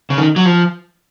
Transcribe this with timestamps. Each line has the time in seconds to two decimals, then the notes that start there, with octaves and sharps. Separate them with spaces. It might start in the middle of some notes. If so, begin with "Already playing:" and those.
0.10 C#3
0.18 D#3
0.36 F#3
0.45 F3